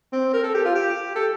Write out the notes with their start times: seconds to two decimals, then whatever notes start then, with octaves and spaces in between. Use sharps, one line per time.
0.12 C4
0.33 A#4
0.43 A4
0.54 G4
0.65 F4
0.75 G4
1.16 A4